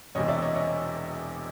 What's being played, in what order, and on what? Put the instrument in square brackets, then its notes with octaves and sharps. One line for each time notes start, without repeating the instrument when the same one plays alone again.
[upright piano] E1 E2 C3 C#5 D#5
D5 E5
C#5 D#5
C#5 D#5